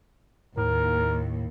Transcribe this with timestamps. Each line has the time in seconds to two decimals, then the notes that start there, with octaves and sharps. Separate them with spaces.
0.57 D#2 A2 A#4